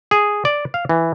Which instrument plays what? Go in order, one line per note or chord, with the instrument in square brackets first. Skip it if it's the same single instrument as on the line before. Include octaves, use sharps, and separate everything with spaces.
[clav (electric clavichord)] G#4
D5
F5
E3